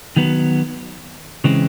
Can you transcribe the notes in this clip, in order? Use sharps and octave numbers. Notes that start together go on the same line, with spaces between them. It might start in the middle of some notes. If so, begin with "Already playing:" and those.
D#3 F#3 B3
C#3 E3 G#3 C4